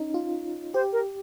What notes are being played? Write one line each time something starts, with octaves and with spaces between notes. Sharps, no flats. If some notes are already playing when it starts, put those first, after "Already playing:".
Already playing: C#4 D#4
F4
G4 C5
A#4